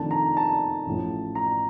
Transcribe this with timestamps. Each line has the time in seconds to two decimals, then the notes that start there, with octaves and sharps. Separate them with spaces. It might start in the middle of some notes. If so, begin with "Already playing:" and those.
Already playing: F2 C3 D#3 A3 D4 A5
0.11 A#5
0.37 A5
0.86 A1 A2 F3
1.35 A#5